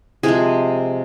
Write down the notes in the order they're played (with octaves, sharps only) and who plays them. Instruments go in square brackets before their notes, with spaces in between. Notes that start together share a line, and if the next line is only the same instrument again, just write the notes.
[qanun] C3 F3 G#3 G#4